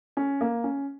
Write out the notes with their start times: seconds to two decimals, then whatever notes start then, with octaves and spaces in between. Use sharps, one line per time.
0.17 C#4
0.41 A#3
0.64 C#4